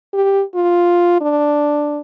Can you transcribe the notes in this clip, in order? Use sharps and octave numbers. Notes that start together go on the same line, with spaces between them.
G4
F4
D4